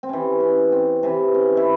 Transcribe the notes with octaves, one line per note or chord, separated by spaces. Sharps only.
C4
C3 E3 C#4
C#4
C4
C3 E3
C#4
E4